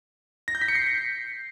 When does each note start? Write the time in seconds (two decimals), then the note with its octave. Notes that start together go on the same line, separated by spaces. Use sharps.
0.48 A#6
0.55 G6
0.62 B6
0.68 C#7
0.75 C7